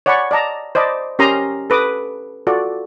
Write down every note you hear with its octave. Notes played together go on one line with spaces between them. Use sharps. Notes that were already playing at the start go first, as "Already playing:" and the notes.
C#5 D5 F#5 G#5 B5 C#6
D5 D#5 A5 A#5
C5 D5 D#5 A5 B5 D6
C#4 G4 A#4 A#5 C6 D#6
A4 B4 D6 D#6
F4 F#4 A4 D5